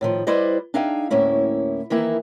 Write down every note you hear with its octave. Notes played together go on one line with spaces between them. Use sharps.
A2 D#3 F3
G3 E4 B4 C5 D5 D#5
D4 D#4 G#4 E5 F5 G5
D2 A2 A#3 C#4 E4
D#3 E3 A#3 E4